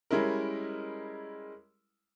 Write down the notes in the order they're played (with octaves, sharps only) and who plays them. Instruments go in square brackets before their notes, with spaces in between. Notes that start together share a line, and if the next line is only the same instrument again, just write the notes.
[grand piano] G3 G#3 C#4 E4 A#4